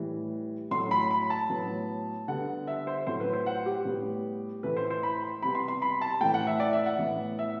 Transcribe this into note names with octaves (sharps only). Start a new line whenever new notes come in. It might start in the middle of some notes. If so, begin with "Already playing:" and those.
Already playing: A2 E3 G3
A2 F#3 A3 C6
B5
B5
A5
A2 F#3 B3
D3 G3 B3 F#5
E5
C5
A2 F#3 A3 C5
B4
C5
F#5
G4
A2 G3 B3
A2 E3 A3 B4
C5
C5
B5
C6
C3 G3 B3 B5
C6
C6
B5
A5
A2 E3 A3 G5
F#5
E5
D5
E5
F#5
A2 E3 B3
E5